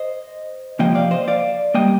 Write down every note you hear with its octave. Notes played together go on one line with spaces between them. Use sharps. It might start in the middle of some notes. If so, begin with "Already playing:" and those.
Already playing: C5 D#5
C3 F3 A#3 D#5 G5
D5 F5
C5 D#5
D5 F5
G3 A#3 D#5 G5